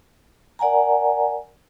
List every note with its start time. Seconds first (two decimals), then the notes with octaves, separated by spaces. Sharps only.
0.59 A#4 D5 F#5 G#5 A#5